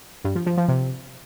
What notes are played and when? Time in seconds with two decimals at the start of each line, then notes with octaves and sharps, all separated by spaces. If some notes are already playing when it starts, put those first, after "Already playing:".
0.24 G2
0.35 F3
0.46 F3
0.57 F3
0.68 C3